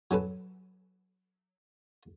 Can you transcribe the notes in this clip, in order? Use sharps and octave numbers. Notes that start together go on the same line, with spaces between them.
F#3 C#4 A4 B4